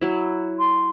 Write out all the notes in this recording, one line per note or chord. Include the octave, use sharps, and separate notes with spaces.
F#3 E4
C6